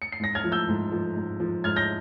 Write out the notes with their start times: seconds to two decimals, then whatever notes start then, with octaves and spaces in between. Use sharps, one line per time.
0.02 C#7
0.12 C7
0.20 G#2 A#6
0.35 F6 G#6
0.44 F3
0.52 E6 G6
0.68 G#2
0.92 F3
1.17 G#2
1.40 F3
1.64 G#2 F6 G#6
1.76 G6 A#6